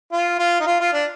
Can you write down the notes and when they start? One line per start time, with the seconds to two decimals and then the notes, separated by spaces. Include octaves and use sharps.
0.12 F4
0.39 F4
0.60 D#4
0.67 F4
0.80 F4
0.93 D4